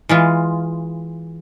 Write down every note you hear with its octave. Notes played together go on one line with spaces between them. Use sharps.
E3 G#3 F4